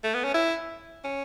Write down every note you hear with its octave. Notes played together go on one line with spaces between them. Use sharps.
A3
B3
C#4
E4
C#4